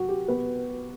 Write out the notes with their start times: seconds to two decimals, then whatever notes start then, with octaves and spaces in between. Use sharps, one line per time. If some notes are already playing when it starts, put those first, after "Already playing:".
Already playing: F#3 F#4
0.09 G4
0.28 B3 B4